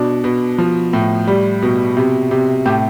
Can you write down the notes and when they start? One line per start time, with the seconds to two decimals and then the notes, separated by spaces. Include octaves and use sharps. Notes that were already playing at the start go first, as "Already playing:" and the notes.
Already playing: B2 D4
0.24 B2
0.58 F3
0.93 A2
1.27 G3
1.62 B2
1.97 C3
2.31 C3
2.66 A2 G4